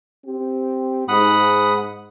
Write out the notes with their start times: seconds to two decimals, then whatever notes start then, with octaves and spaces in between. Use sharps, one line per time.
0.25 C4 G4
1.08 G#2 F#5 B5 D#6